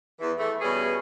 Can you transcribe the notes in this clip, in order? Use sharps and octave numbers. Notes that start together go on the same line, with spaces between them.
E2 E3
E3 A3
B2 E3 G3 C#4 G#4